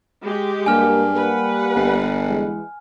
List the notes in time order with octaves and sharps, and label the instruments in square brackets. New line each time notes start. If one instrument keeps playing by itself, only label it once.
[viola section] G#3 G4
[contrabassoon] G2 [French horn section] A#3 [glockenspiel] G#5 F6
[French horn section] G3 A#3 [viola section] B4 F#5
[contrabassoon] G1
[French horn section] E3 G#3